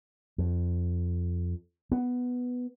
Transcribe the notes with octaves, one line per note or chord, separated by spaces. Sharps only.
F2
B3